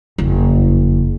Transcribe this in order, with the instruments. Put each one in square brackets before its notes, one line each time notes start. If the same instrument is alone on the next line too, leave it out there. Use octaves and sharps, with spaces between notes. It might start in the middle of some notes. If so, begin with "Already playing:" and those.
[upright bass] F#1 F2